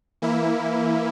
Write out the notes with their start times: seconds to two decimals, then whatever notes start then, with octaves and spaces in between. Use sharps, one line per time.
0.22 E3 A#3 E4